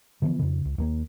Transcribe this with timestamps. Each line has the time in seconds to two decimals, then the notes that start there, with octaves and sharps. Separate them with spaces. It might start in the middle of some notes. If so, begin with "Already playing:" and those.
0.22 D3 E3 F3 B3
0.39 F2 C#3
0.65 C#2
0.78 D#2 A3 A#3